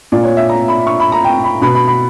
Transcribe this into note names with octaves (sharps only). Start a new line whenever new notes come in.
A#2 D5
C#5
E5
A#5
B5
C#6
B5
A#5
G5
B5
B2 B5
B5
B5